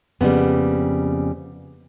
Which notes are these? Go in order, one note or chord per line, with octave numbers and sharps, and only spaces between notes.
F2 C#3 E3 G3 A#3 B3